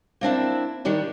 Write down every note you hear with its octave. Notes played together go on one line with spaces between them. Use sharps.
A#3 C4 D4 E4
D#3 G3 D4 E4